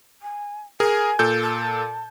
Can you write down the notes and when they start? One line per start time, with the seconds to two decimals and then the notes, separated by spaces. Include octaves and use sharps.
0.22 G#5
0.80 G#4 A#4 G#5
1.19 A#2 A4 G6
1.42 A5